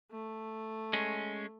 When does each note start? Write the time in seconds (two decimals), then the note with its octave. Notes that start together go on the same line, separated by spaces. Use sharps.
0.11 A3
0.93 G#3 C#4